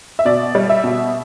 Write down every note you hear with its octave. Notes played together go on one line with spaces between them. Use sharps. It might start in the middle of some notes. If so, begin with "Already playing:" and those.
E5
B2 D5
G3
E5
B2